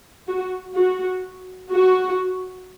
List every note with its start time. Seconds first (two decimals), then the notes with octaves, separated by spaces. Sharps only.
0.28 F#4
0.76 F#4
1.70 F#4